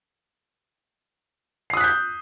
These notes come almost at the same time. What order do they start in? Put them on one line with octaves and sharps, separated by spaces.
C7 D#6 F#6 B6 G6